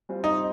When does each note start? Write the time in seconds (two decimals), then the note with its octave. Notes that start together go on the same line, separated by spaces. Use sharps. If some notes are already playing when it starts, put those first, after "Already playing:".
0.09 G3 C4 F4
0.24 D#4